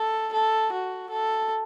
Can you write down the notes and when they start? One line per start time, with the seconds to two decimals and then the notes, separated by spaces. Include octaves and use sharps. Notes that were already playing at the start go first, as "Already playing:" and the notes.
Already playing: A4
0.33 A4
0.72 F#4
1.10 A4